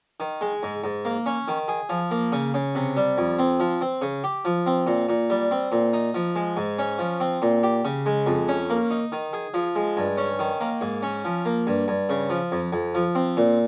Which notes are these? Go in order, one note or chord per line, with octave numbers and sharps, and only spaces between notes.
D#3
G#3
G#2
G#2
A#3
C#4
D#3
G#4
F3
A#3
C#3
C#3
C3
G3
F2
C4
F3
C4
C#3
G4
F3
C4
A#2
A#2
G3
C4
A#2
D#4
F3
G#3
G#2
C#4
F3
C4
A#2
G4
C#3
G#3
F2
C#4
A#3
D#4
D#3
G#4
F3
G#3
G2
C#4
D#3
A#3
G#2
C#4
F3
A#3
G2
G2
C#3
F3
F2
F2
F3
C4
A#2